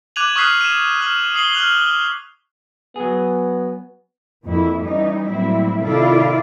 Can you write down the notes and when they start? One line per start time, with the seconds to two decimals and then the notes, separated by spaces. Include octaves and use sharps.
0.16 D6 F#6 G#6 D#7 F7 F#7
0.36 C#6 D#6 F6 F#6 B6 C7
0.61 D#7 E7
1.01 F6 F#7
1.34 D#6 C7 F#7 G7
1.53 F6 F#6 F7 G7
2.96 F#3 B3 G#4
4.44 F2 E3 A#3 E4
4.80 E3 G3 C#4 D#4
5.26 A2 F#3 G3 A#3 C4 E4
5.82 C3 D#3 E4 F4 A4 D5